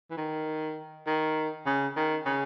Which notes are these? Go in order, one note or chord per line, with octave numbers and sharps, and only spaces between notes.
E3
D#3
D#3
C#3
D#3
C#3